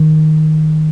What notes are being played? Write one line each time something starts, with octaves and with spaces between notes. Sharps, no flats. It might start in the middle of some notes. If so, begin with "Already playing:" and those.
Already playing: D#3